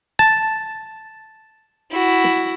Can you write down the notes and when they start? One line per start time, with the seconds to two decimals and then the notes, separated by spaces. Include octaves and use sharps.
0.19 A5
1.91 E4 F#4